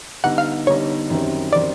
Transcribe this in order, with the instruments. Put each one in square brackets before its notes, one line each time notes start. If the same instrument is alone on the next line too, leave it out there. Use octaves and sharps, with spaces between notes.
[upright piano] D3 G3 B3 D#4 [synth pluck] F#5
[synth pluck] F5
[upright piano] D3 G3 B3 D#4 [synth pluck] C#5
[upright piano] F#2 D#3 G3 C4
[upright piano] D#3 G3 C4 [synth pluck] D5